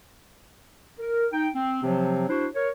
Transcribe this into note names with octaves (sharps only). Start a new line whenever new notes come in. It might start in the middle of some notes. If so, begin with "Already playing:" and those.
A#4
D#4 G5
C4
C3 F3 F#3 C4
D4 E4 F#4 C5
A#4 C#5